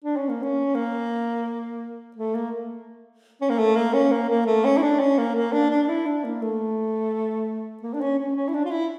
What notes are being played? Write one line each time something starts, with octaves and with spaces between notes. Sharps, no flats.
D4
C#4
A#3
C#4
A#3
A3
A#3
C#4
A#3
A3
A#3
C#4
A#3
A#3
A3
C#4
E4
D4
C#4
A#3
A#3
D4
D4
D4
E4
D4
A#3
A3
A#3
D4
C#4
C#4
C#4
E4
D4
F4
E4